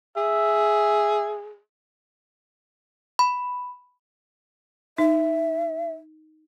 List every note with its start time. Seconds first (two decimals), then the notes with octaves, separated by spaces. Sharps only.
0.17 G#4 E5
3.19 B5
4.98 D#4 E5